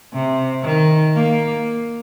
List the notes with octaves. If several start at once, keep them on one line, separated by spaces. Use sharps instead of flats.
C3
D#3
A#3